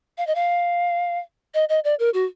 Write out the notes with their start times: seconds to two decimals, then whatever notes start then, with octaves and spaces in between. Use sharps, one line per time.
0.18 F5
0.27 D#5
0.35 F5
1.54 D#5
1.69 D#5
1.84 D5
1.99 A#4
2.14 F#4